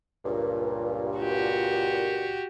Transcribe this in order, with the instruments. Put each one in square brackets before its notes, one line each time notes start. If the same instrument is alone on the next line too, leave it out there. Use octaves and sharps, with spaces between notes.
[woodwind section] C#2 G2 A#2
[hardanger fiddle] F#4 G4